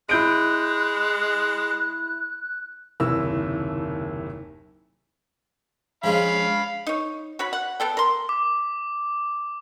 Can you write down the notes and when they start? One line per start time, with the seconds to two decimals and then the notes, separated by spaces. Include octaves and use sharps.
0.09 G#3 E4 F#6 G6 D7
3.00 F#1 D#2 C3 D#3 E4 E6
6.04 F3 G#3 C#4 F5 B5
6.87 D#4 C#5
7.39 F#4 C#5 B5
7.53 F#5
7.80 B3 A4 G5
7.97 A#4 C6
8.29 D6